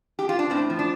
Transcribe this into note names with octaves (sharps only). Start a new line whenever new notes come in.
G4
F4
D4
A2 C4
F3
D4